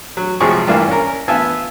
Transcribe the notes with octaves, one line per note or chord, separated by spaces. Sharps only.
F#3
G#1 C3 F3 F#3 G#4 C#6
G2 E3 A#3 D4 E4 F4
C#4 A#4
B3 F4 E5 G#5 A5